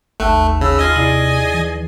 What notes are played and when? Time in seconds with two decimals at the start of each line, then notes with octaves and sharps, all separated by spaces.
0.20 G#1 D#2 A3 A5 F#6
0.61 C#3 B5 E6
0.79 F4 D#5 G#5
0.96 C3 E4 G#4 D5
1.54 E3